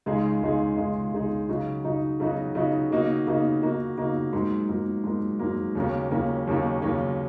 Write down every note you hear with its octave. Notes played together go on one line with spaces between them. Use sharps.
C#2 C#3 G#3 D#4 G#4
C#2 C#3 G#3 D#4 G#4
C#2 C#3 G#3 D#4 G#4
C#2 C#3 G#3 D#4 G#4
C#3 F#3 D#4 F#4
C#3 F#3 D#4 F#4
C#3 F#3 D#4 F#4
C#3 F#3 D#4 F#4
C#3 A#3 D#4 F#4
C#3 A#3 D#4 F#4
C#3 A#3 D#4 F#4
C#3 A#3 D#4 F#4
G#2 F#3 A#3
G#2 F#3 A#3
G#2 F#3 A#3
G#2 F#3 A#3
D#2 C#3 F#3 A#3 C#4
D#2 C#3 F#3 A#3 C#4
D#2 C#3 F#3 A#3 C#4
D#2 C#3 F#3 A#3 C#4